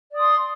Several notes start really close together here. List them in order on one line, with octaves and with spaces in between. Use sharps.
D5 D#6 C6